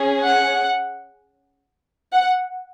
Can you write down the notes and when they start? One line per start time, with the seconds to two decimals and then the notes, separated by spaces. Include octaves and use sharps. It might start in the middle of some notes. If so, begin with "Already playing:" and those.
Already playing: C#4 G#4
0.22 F#5
2.14 F#5